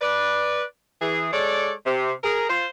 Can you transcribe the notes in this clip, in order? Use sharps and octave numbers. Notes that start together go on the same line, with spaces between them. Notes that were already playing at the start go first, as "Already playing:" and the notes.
B4 D5
E3 G#4
G#3 A4 C#5 D5
C3
G#4 A#4
F4 C5